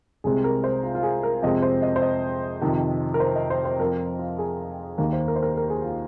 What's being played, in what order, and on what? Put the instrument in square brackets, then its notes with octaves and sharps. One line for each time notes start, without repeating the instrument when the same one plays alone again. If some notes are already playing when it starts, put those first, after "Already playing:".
[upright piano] C2 C3 G#3 C4 G#4
A#4
C5
F4
F4
G#4
A#4
F2 C3 G#3 C4 D#5
C5
D#5
C5
D#5
F2 C3 D#3
A#4
C5
D#5
C5
C5
F2 F3 C4 A#4
F4
G#4
D#2 D#3 A#3 A#4
C5
A#4
C5
A#4
A#4
G#4
F4